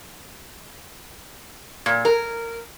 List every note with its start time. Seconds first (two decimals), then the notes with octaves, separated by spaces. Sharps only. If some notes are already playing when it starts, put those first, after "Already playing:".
1.86 A#2
2.05 A#4